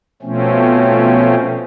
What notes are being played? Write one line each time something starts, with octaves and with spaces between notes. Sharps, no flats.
B2 F3 A3 C4 C#4